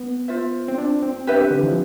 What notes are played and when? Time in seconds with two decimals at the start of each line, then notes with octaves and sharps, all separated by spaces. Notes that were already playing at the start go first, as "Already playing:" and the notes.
Already playing: B3
0.28 F4 C5 E5
0.68 C4
0.78 D4
1.03 C4
1.27 D4 G4 B4 E5
1.51 D3
1.60 E3
1.67 F3